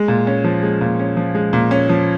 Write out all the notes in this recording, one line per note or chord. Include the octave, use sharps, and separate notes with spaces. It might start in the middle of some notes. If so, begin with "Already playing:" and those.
Already playing: G#3
A#2
C#4
F3
G#3
A#2
C#4
F3
G#3
A#2
C#4
F3